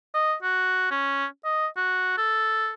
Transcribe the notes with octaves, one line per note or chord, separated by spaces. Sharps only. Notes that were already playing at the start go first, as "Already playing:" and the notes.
D#5
F#4
C#4
D#5
F#4
A4